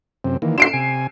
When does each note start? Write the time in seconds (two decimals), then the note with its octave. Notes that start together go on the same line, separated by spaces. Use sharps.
0.24 F#2 C3 C4
0.42 D#3 E3 A#3
0.58 D4 F#4 C6 C7 D7 E7
0.73 C3 G#5